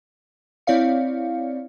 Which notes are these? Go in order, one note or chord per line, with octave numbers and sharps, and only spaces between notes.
C4 E4 C#5 D5 F5 C#7